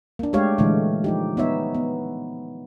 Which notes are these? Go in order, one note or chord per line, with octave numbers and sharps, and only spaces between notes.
A#3 D4
G#3 A3 D4 G4 C#5 F5
A#2 D3 E3 G#3 A3
F3 D#4 G4
B3 D#4 C#5 E5
B3